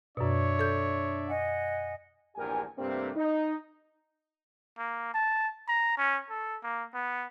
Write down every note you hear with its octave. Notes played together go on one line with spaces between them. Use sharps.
F#2 B2 D4 C#5 D5 E5
A4 G6
D#5 F#5 G#5
A#1 E2 G2 G4 A#4 G#5
G2 C3 G3 A3 A#3 C4
D#4
A#3
A5
A#5
C#4
A4
A#3
B3